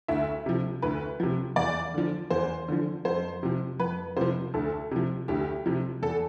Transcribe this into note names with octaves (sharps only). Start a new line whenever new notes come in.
D2 E5
C3 F3
D2 B4
C3 F3
E2 D5
D3 F3
E2 C5
D3 F3
F2 C5
C3 F3
F2 B4
C3 F3 C5
D2 A4
C3 F3
D2 G4
C3 F3
E2 A4